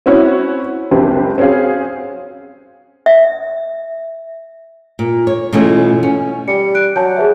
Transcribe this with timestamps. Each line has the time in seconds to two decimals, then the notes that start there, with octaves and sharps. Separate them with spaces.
0.06 C4 C#4 E4 F#4 C#5
0.91 F#1 C#2 C4 D4 G4 B4
1.38 C4 C#4 F#4 G#4 F5
3.06 E5
4.99 A#2
5.27 C#5
5.53 B2 E3 A3 C#4 F4 G#4
6.03 C#4
6.48 G3 D5 C#7
6.75 F#6 D7
6.96 F#3 G#5 A5 G6
7.17 G#4 B4 E5